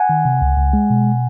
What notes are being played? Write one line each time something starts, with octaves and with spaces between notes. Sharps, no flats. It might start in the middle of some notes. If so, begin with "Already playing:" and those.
Already playing: F#5 G#5
D#3
C3
C#2
C#2
G#3
B2